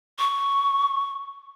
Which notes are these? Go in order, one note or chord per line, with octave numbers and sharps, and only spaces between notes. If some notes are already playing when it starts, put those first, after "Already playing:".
C#6